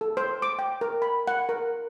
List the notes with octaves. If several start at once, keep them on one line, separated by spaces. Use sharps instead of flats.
A4
C5
D6
G5
A#4
B5
F#5
A#4